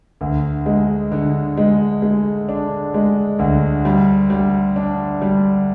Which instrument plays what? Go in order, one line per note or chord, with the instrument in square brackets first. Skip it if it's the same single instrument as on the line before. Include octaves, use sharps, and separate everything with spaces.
[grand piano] D2
G#3
D3
G#3
G#3
D4
G#3
D2
G3
G3
D4
G3